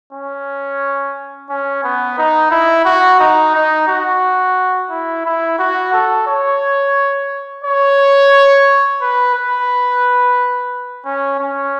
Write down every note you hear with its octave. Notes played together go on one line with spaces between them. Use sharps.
C#4
C#4
B3
D#4
E4
F#4
D#4
D#4
F#4
E4
E4
F#4
A4
C#5
C#5
B4
B4
C#4
C#4